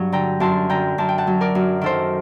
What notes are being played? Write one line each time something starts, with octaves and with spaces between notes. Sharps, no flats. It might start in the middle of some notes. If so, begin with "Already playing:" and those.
Already playing: G2 F#3
D3 G5 A#5
F#2 A5 C6
D3 G5 A#5
F#2 A5
G5
F#5 A5
F#3
A#4 D5
F#2
D#3 A4 C5